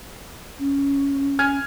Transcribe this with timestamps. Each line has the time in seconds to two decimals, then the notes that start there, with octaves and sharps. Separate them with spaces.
0.59 C#4
1.39 G#5 F6 G#6